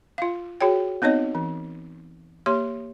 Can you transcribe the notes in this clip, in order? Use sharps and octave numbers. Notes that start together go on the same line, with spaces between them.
F4 F5
F#4 G#4 C#5 G5
B3 C4 D#4 C#5 D#5
E3
A#3 G4 C#5 C6